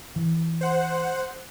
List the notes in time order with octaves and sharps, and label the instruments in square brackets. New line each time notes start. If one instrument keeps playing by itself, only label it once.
[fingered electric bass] E3
[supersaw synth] C5 F#5